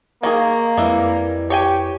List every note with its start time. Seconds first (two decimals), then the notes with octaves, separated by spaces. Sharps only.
0.23 D#3 A#3 G#4 F5 C#6 D6
0.77 F2 G3 G#3 E4 B4 E5
1.50 G4 C#5 G5 G#5